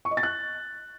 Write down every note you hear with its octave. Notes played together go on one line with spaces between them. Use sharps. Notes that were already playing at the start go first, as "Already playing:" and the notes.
C#6
D#5
A6
F#6